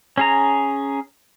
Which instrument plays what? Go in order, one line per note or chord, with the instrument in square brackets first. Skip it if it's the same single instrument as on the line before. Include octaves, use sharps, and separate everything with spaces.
[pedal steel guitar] C#4 G#4 A#5